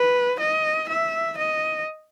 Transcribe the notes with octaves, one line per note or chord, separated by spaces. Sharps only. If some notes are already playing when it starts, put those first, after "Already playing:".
Already playing: B4
D#5
E5
D#5